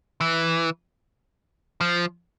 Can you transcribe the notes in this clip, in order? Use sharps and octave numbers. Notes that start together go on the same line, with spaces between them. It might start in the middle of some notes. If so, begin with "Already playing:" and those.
E3
F3